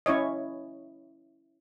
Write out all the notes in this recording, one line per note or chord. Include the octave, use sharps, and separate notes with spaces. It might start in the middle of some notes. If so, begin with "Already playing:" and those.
C#4 E4 C#5 D#5